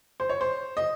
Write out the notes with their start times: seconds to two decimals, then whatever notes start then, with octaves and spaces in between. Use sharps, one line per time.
0.20 C5
0.29 C#5
0.41 C5
0.77 D#5